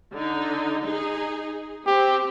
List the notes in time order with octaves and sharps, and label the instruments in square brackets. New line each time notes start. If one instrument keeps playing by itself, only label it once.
[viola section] D3 D#4
D#4 G#4
[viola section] C4 [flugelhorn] G4